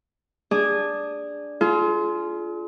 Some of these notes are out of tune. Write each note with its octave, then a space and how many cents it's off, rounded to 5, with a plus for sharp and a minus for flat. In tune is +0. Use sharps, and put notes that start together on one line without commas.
D4 +0 G#4 -15
F4 -10 G#4 +40